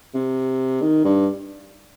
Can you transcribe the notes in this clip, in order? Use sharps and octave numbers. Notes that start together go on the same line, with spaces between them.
C3
D#3
G2